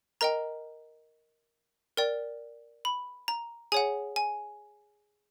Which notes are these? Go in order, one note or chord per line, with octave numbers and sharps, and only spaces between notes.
A#4 D#5 G5 A#5
A#4 D5 G5
B5
A#5
G#4 C#5 F#5 G#5
G#5